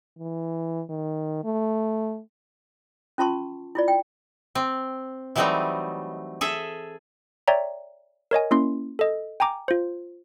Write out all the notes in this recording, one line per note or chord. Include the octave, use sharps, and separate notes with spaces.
E3
D#3
A3
C#4 F4 A5 C6 C#6
E4 F4 D5
G5
C4
E3 F#3 G3 A3 C4 D#4
G#4 A4 E5
C#5 D5 E5 G5 A#5
A#4 C#5 D#5 G#5
A#3 C#4 E4 C6
A4 D#5
G5 G#5 A#5 D6
F4 C5